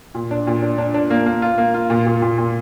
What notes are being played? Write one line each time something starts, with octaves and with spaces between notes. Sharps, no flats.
A#2
D4
A#2
D4
D4
D4
A#3
A#3
F4
A#3
F4
A#2
A#2
A#2
A#2